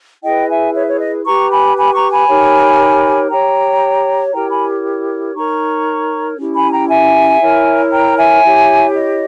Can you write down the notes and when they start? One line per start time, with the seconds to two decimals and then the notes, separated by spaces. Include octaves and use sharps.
0.23 E4 G#4 B4 D#5 G5
0.49 E5 G#5
0.74 C#5 E5
0.87 C#5
1.00 D#5
1.25 G4 B4 A#5 C#6
1.51 G#5 B5
1.76 G#5 B5
1.94 A#5 C#6
2.11 G#5 B5
2.28 D#4 G4 A#4 C#5
3.30 G4 C#5 G5 A#5
4.33 E4 G4 A#4 C#5 G5 A#5
4.50 G#5 B5
5.35 D#4 A#4 C#5 A#5 C#6
6.38 C#4 E4 G4
6.55 G#5 B5
6.72 G5 A#5
6.89 E5 G#5
7.40 E4 A#4 C#5
7.91 G5 A#5
8.17 E5 G#5
8.42 E4 G4 C#5
8.94 D#5